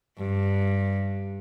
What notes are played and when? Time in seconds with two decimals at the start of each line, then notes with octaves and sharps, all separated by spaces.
0.18 G2